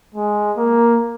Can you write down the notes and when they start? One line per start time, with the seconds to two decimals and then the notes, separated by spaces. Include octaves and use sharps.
0.14 G#3
0.57 A#3